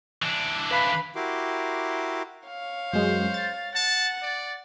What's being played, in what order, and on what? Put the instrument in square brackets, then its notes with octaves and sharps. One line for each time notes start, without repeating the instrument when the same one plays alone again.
[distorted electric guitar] E3 D4
[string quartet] B4 F5 B5
[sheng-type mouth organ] E4 F#4 G4 A#4 C6 D6
[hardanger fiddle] C#5 F5
[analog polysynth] F#2 G#3 [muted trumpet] C5
[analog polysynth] A6
[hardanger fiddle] F#5 [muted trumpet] A5
[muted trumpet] D5